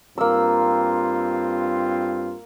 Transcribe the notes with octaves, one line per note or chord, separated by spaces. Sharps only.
G2 A#3 C4 F4 E6